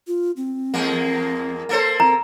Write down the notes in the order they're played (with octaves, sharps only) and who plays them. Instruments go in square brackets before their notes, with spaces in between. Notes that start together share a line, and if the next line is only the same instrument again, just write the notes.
[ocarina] F4
C4
[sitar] E2 G#3 A#3
A#3 A4 C5
[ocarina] C4 [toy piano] A#5